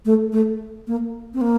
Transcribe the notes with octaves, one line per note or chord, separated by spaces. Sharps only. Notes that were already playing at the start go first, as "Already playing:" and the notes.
A3
A3
A#3
C4
A#3